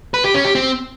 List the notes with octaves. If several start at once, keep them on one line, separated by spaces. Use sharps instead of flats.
B4
G4
C#4
G4
C4